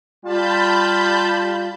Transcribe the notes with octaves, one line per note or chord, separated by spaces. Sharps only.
G3 F4 A5 B5 G6